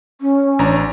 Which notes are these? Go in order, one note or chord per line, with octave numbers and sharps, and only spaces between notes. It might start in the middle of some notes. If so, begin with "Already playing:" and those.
C#4
A1 D4 A#5